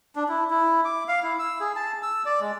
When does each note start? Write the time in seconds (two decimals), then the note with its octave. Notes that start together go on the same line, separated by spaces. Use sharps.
0.16 D4
0.29 E4
0.50 E4
0.85 D6
1.08 F5
1.23 E4
1.39 E6
1.60 G#4
1.76 A5
2.03 E6
2.25 D5
2.41 G#3